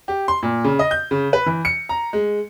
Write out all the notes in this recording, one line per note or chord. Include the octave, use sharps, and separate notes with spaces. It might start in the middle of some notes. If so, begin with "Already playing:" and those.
G4
C6
A#2
C#3
D#5
G6
C#3
B4
E3
C#7
A#5
G#3